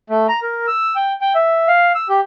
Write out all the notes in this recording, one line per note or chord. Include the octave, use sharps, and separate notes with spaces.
A3
A#5
A#4
E6
G5
G5
E5
F5
E6
G4